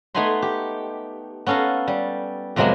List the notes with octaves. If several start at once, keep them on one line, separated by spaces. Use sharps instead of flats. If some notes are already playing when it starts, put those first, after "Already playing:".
A3 B3 D#4 G#5 B5 C6
G4
B3 C#4 A4 F5 A#5
G3
F2 C3 F#3 G#3 A#3 B3